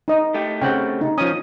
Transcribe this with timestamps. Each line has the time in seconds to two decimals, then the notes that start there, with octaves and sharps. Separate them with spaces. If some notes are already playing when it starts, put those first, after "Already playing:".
0.08 D#4 D#5
0.34 A3 G4
0.61 C#3 C4 F#5 G5
1.01 D#4
1.18 F3 C#4 D#6